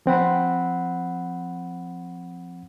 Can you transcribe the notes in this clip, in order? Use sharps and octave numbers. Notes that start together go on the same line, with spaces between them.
F3 C4 F#5 B5